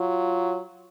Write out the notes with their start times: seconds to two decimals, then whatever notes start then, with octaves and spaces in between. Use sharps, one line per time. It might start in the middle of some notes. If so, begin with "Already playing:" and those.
Already playing: F#3 F4